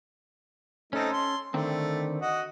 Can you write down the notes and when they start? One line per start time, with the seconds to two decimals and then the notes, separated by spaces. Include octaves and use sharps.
0.93 A3 C4 C#4 D#4 A4
1.12 C6
1.54 D3 D#3 A3 C4
2.21 F#4 D#5 F#5